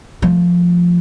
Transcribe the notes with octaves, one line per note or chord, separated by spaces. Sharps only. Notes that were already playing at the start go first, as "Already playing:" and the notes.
F3 A3